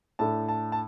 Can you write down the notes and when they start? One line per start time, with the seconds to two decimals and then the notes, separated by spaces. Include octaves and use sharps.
0.19 A2 A3 D4 A5
0.48 A5
0.72 A5